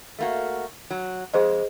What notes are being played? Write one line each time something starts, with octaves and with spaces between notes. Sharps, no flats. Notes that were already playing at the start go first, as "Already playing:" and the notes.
A3 A#3 F#4
F#3
F2 G#3 G#4 C5 D#5